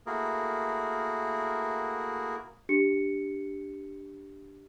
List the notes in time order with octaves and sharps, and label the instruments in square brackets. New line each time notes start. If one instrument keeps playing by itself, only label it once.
[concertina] A3 A#3 E4 F#4 G#4 A#4
[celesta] D4 G4 C#7